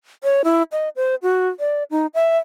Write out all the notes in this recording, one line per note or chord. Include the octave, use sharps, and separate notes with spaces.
C#5
E4
D#5
C5
F#4
D5
D#4
E5